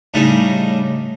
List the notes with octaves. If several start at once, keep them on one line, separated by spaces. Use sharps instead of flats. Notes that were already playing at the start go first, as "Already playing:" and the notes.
A2 C#3 G3 D4 D#4